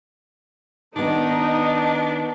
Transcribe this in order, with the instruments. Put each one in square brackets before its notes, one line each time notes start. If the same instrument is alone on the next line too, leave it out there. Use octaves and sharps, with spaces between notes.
[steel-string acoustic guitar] D#3 B3 [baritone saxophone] D4 [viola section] D#4